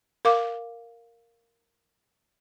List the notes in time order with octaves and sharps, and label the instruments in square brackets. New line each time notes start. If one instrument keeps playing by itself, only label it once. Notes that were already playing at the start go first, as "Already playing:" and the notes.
[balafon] A#4 F5 D6